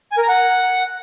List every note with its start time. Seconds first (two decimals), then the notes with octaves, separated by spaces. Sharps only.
0.12 G#5
0.17 A#4
0.23 A#5
0.29 F#5